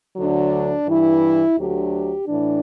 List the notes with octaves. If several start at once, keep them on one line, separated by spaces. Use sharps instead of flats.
D2 D3 F#3 D4
G2 E3 E4
D2 D3 F#3 G4
A2 E3 D4